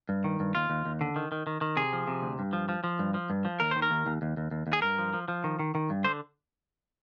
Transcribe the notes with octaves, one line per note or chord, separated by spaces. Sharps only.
G2
D#3
G2
D#2 F4
D#2
D#2
D3
D#3
D#3
D#3
D#3
C3 G#4
F3
C3
D2
G2
F3
F3
F3
G2
F3
G2
F3
D#2 A#4
D#3 C5
A#4
D#2
D#2
D#2
D#2
D#2
D#2
G#4
G2 A#4
F3
F3
F3
D#3
D#3
D#3
G2
D3 C5